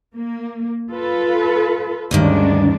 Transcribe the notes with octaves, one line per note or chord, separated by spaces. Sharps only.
A#3
F4 A4 B4
D2 G2 D#3 G#3 C#4 D4